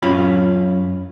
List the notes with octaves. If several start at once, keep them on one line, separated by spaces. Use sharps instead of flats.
F#2 C#4 F4 F5 B5